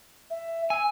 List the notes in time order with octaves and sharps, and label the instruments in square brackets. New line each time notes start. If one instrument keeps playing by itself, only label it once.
[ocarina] E5
[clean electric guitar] G#5 [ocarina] E6